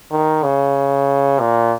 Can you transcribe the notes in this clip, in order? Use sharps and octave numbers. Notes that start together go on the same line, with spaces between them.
D#3
C#3
A#2